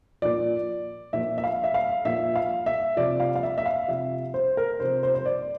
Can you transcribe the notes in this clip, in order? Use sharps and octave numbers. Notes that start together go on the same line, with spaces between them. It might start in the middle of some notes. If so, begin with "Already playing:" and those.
A#2 F3 D5
A#2 F3 E5
E5
F5
E5
F5
A#2 F3 E5
F5
E5
C3 F3 D5
F5
F5
E5
E5
F5
C3 F3 E5
C5
A#4
C3 F3 C5
C5
C5
D5